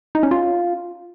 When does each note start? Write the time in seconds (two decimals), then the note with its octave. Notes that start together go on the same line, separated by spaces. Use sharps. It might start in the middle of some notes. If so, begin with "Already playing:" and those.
0.15 D#4
0.23 C#4
0.31 F4